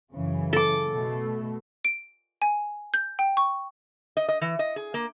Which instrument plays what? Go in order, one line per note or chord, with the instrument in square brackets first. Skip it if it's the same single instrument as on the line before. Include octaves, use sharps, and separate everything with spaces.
[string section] F#2 C#3 E3
[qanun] A4 D6
[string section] B2 A3
[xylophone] D7
G#5
G6
G5
C#6
[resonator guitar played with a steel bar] D#5
D#5
E3
D#5
G#4
A#3